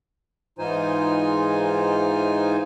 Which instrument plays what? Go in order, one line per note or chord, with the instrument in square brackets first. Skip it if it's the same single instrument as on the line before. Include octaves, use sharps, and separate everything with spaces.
[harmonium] G#2 E3 D#4 F4 C5 G#5